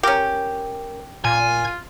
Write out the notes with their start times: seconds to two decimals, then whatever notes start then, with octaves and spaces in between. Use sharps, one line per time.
0.03 C#4 G4 A#4
1.25 A#2 F4 G#5